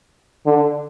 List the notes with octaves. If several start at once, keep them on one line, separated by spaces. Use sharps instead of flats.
D3